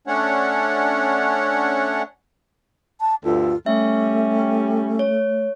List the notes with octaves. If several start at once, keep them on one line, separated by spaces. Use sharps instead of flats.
A3 C#4 D4 C#5 F#5
A5
D2 G2 F4 A4
G3 A3 C#4 E5
C#5